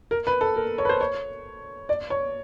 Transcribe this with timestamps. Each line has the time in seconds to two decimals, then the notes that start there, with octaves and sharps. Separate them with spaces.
0.11 A#4
0.27 B4
0.41 A4
0.56 A#4
0.78 C#5
0.85 B4
0.89 C5
1.01 C#5
1.89 D5
2.10 C#5